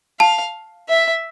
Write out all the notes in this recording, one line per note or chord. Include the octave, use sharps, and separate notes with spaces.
F5 A5
E5